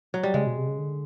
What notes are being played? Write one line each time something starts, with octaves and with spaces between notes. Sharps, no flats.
F#3
G3
C#3 G#3
B2
C3
C#3
D3